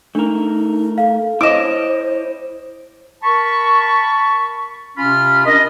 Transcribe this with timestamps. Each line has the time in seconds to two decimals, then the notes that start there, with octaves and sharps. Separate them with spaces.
0.15 A3 D4 D#4 A#4
0.98 A4 F5
1.41 E4 C5 C#5 D#5 D6 D7 E7
3.23 A#4 A5 B5 C#6
4.98 C3 C#4 F4 B5 F6
5.46 D4 A#4 D#5